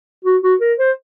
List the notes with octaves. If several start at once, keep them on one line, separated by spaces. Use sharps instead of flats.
F#4
F#4
A#4
C5